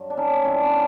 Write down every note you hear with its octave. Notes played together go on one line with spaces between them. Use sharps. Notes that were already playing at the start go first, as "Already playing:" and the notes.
Already playing: G2 F#3
D4
C#4 D#4
G2 E3 C4 D4
B3 C#4